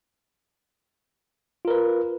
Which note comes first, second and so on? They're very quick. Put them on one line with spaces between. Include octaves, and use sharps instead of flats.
F4 A#4 B4